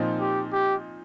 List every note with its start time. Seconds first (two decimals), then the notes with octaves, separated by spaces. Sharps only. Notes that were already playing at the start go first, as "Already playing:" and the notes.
Already playing: A#2 F3 C4 D#4
0.20 G4
0.53 G4